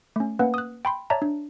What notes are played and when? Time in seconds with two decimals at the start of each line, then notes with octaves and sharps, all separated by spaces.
0.16 A3 C#4
0.39 A#3 C#4 B4 F#5
0.54 D#6 F#6
0.85 G5 B5 C6
1.10 C#5 D5 E5 A5 A#5
1.22 D4